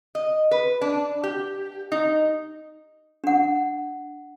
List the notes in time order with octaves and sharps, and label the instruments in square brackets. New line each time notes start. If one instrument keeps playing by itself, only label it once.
[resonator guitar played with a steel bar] D#5
B4
D4
G4
D#4
[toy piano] D4 F#5